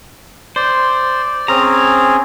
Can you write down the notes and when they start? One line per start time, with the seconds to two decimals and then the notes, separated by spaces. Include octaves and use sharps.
0.56 C5 D5
1.48 C4 C#4 G#4 A#5